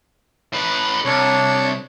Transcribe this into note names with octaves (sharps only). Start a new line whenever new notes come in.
A2 B4
C2 D4 C#5